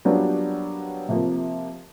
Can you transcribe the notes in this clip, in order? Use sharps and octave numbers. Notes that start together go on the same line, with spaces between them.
F#3 G3 A#3 B3 D4 F4
C3 F3 A#3